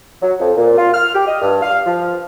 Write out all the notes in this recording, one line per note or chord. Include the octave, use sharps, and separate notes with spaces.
F#3
F2
A#2
F4
F6
G4
D#5
G2
F5
F3